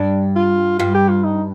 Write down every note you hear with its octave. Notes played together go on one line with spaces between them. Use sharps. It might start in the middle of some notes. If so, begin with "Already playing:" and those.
Already playing: G2 D4
F4
G2 F4
G4
F4
D#4